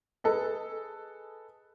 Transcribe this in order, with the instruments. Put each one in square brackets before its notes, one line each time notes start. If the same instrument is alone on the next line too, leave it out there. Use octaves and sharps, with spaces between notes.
[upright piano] G#4 A4 B4 D#5